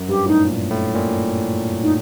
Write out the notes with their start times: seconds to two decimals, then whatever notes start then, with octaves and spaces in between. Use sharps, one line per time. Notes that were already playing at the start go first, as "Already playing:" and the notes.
Already playing: F#2
0.09 G2 G4
0.27 A2 D#4
0.46 A#2
0.70 A2
0.94 A#2
1.82 D#4